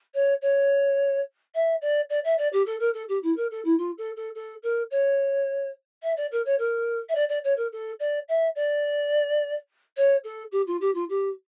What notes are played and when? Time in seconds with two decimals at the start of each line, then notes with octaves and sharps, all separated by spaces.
0.14 C#5
0.42 C#5
1.54 E5
1.81 D5
2.10 D5
2.24 E5
2.38 D5
2.53 G4
2.66 A4
2.80 A#4
2.94 A4
3.08 G4
3.23 E4
3.36 A#4
3.51 A4
3.64 E4
3.78 F4
3.98 A4
4.16 A4
4.35 A4
4.63 A#4
4.91 C#5
6.02 E5
6.17 D5
6.32 A#4
6.45 C#5
6.59 A#4
7.09 E5
7.15 D5
7.29 D5
7.44 C#5
7.57 A#4
7.72 A4
8.00 D5
8.28 E5
8.55 D5
9.97 C#5
10.24 A4
10.52 G4
10.67 F4
10.81 G4
10.94 F4
11.09 G4